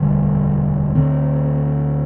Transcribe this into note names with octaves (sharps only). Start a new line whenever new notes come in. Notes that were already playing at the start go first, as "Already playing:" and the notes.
Already playing: E1 D2 D3 G3
D2 D3 A3 C4